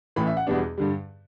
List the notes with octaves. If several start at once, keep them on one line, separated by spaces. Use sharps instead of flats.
A1 A2 E3 B5
E5
F#5
E2 B2 G3 B3 D4
G2 D3 G3